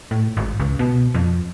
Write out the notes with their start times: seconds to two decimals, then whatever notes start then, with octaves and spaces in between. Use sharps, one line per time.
0.11 A2
0.37 G#1
0.60 C#2
0.79 B2
1.14 F2